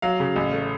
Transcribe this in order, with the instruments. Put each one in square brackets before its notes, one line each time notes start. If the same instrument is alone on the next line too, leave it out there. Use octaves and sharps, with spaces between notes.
[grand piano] F#3 F5
C#3
A1
A3